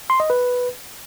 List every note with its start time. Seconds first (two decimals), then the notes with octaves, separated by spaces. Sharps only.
0.10 C6
0.20 D#5
0.30 B4